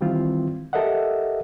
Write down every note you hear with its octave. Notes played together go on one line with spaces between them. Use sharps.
D#3 E3 G3 C4 E4 F4
G4 A4 A#4 D#5 E5 F#5